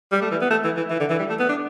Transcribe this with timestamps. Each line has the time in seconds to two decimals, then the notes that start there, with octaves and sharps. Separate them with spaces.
0.12 G3
0.21 A3
0.31 E3
0.41 B3
0.50 A3
0.64 E3
0.77 E3
0.90 E3
1.00 D3
1.10 E3
1.19 G3
1.29 A3
1.39 B3
1.49 D4